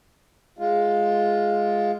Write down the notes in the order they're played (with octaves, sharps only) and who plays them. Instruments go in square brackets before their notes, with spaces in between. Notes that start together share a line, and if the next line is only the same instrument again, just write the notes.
[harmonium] G#3 F4